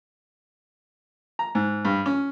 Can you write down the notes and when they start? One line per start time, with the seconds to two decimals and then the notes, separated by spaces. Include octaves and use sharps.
1.39 A#5
1.55 G#2
1.85 G2
2.06 C#4